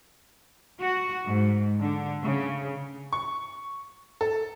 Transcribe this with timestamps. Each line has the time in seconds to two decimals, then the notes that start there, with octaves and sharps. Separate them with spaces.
0.80 F#4
1.25 G#2
1.80 D3
2.24 C#3
3.13 C#6
4.21 A4